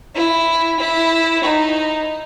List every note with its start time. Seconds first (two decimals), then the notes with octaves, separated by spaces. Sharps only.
0.15 E4
0.79 E4
1.44 D#4